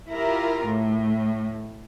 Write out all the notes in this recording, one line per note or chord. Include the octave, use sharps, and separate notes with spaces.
E4 F4 G4 A#4
A2